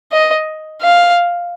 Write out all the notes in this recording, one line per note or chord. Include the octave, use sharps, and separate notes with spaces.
D#5
F5